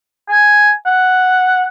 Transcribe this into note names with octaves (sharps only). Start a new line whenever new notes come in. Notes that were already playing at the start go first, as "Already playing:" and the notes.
G#5
F#5